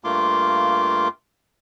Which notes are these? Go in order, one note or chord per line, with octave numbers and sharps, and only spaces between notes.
G2 A3 A#3 F4 C6 D6